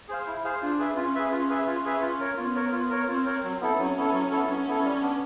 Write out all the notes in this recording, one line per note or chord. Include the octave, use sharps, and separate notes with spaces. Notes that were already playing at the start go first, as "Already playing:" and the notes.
G#4 C5 F5
E4
G#4 C5 F5
D4 F4
G#4 B4 E5
C#4 F4
G#4 B4 E5
C#4 F4
G#4 B4 E5
F4
G#4 B4 E5
F4
A#4 C#5
B3 F4
A#4 C#5
F4
A#4 C#5
C4 F4
A#4 C#5
F#3
B3 E4 A4
F#3 C#4
B3 E4 A4
F#3
B3 E4 A4
F#3 C#4
B3 E4 A4
G3
B3 D4